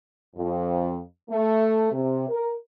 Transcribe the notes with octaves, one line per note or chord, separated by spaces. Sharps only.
F2
A3
C3
A#4